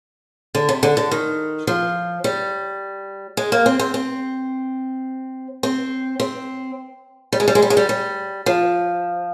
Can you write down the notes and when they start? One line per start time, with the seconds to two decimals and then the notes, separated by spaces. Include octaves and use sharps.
0.55 D3
0.69 C3
0.83 D3
0.97 D3
1.11 D#3
1.67 F3
2.24 G3
3.37 G#3
3.52 A#3
3.66 C4
3.79 C4
3.94 C4
5.63 C4
6.20 C4
7.32 G3
7.40 G#3
7.48 G3
7.55 G#3
7.62 G3
7.70 G#3
7.77 G3
7.89 G3
8.46 F3